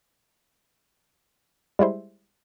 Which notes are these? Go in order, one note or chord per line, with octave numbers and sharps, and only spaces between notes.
G3 G#3 E4 C5